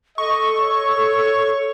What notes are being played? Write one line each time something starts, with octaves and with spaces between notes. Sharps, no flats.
A4 D#5 C#6
C#5